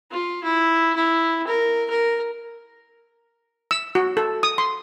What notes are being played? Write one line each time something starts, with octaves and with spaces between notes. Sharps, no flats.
F4
E4
E4
A#4
A#4
E6
F#4
A4
D#6
C6